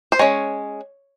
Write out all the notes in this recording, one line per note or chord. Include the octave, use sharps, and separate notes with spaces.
C5
G#3 C#4 C#5